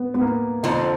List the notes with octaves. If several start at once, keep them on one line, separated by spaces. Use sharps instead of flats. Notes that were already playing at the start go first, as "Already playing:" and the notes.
Already playing: B3
B3
A#3
F2 D3 F3 D#4